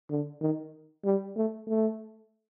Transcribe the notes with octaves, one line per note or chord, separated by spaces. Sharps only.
D3
D#3
G3
A3
A3